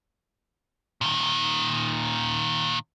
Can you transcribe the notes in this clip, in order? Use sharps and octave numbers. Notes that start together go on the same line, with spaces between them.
A#2 D#3